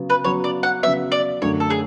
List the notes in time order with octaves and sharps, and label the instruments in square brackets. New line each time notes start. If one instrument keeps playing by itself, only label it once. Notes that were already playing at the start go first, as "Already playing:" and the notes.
Already playing: [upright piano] C#3 F#3 B3
[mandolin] B4
[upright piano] C#3 F#3 B3 [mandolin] C#5
[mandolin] D5
F#5
[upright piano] C#3 F#3 B3 [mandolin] E5
[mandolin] D5
[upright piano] F#2 D3 A3 [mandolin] C#5
[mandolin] A4
G#4